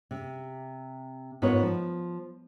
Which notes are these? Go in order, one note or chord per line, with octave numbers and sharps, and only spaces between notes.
C3
G#2 B3 F4 A#4 C#5
F3